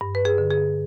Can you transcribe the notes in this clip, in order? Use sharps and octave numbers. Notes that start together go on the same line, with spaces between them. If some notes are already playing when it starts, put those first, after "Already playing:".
G2
B4
G#4
D3
G#4